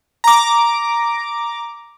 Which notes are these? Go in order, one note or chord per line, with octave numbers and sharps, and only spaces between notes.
A#5 D6